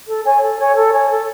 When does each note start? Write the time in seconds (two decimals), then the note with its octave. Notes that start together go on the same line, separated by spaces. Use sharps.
0.07 A4
0.24 C#5 G#5
0.41 A4
0.58 C#5 G#5
0.75 A4
0.92 C#5 G#5
1.08 A4